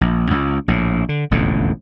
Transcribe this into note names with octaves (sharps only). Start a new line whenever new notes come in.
A#1
C#2
A#1 A2
D3
E1 A1 F2 D3